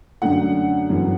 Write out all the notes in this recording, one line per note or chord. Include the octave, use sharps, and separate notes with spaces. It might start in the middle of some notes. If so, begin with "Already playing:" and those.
F#2 D3 A3 F#5
G1 F#2 E3